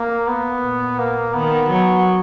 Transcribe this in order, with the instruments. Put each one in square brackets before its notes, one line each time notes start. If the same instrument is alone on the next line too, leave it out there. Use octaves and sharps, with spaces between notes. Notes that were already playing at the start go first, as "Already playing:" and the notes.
Already playing: [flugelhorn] A#3
B3
[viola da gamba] A#2
[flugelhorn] A#3
[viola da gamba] D#3 [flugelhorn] B3
[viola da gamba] F#3